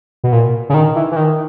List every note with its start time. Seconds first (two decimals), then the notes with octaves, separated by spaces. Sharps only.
0.24 B2
0.33 A#2
0.70 C#3
0.74 D#3
0.96 E3
1.12 E3
1.16 D#3